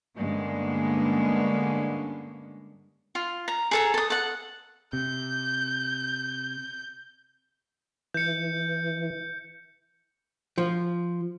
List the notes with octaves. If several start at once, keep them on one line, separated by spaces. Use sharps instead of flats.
G2 D3 G#3 A#3 B3 C#4
F4
A#5
G#4 A4 A#5
A4 D#6
A4 F#5
C3 G6
E3 G6 C#7
F3